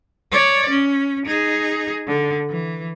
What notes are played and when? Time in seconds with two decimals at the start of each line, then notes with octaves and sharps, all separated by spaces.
0.32 C#5 D5
0.70 C#4
1.26 D#4 G#4
2.07 D3
2.50 E3